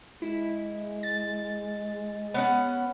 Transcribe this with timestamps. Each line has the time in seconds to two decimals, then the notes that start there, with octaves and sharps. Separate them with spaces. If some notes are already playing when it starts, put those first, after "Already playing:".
0.22 G#3 E4
1.03 A6
2.34 B3 C#4 F#5